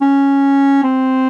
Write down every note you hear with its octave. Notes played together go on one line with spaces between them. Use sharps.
C#4
C4